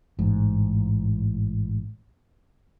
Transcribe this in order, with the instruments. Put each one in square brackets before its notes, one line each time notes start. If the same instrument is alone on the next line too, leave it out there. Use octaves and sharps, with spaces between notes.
[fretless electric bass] A1 G#2